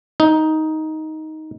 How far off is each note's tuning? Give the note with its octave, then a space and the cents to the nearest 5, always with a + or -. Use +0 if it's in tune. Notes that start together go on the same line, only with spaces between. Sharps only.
D#4 +10